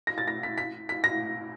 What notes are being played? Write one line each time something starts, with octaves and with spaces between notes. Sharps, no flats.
A#6
A6
A#6
B6
B6
B6
A#6